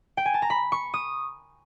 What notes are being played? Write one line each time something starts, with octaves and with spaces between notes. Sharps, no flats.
G5
G#5
A5
A#5
B5
C#6
D#6